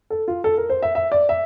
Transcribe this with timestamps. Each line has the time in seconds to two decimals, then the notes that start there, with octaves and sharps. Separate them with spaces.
0.10 A4
0.28 F4
0.44 A4
0.57 A#4
0.70 C5
0.82 E5
0.95 E5
1.12 D5
1.29 E5